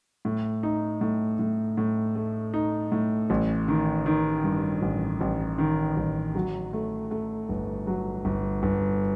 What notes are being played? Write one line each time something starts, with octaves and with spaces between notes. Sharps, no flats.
A2
D#4
A2
A2
A2
A3
D#4
A2
A1
D#3
D#3
G2
A1
A1
D#3
A1
F#3
A3
A3
G1
F#3
G1
G1